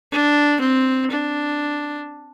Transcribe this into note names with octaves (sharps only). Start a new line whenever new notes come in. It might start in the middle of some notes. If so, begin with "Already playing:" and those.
D4
C4
D4